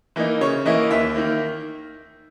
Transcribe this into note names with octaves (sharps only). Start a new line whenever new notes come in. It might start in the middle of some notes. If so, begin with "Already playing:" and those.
E3 A#3 D#4
C#3 C#5
E3 A#3 E4 D#5
D#2 E5
D#3 A#3